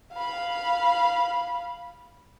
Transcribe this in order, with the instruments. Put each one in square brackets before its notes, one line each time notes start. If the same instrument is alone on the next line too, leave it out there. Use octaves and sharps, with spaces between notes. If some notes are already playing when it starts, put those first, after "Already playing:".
[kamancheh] F5 B5